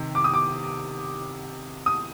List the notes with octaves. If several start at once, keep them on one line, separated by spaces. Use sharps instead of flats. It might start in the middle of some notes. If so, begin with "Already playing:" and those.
Already playing: C3 D#3
D6
D#6
D6
D#6